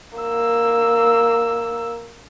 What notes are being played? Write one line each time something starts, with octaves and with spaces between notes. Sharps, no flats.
A#3 E6